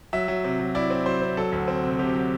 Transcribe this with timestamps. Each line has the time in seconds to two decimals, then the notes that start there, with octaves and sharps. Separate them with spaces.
0.13 F#3 E5
0.28 F#3
0.44 C3
0.60 F#3
0.75 E4 D5
0.90 C4
1.06 F#3 C5
1.22 C4
1.37 F#3 A4
1.52 D2
1.68 C4
1.84 C3
1.99 C3 G4
2.15 F#3